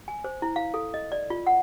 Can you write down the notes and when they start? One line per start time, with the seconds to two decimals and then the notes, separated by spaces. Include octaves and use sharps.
0.08 G#5
0.24 C5
0.42 E4
0.56 F5
0.74 A4
0.94 D#5
1.12 D5
1.30 F4
1.47 F#5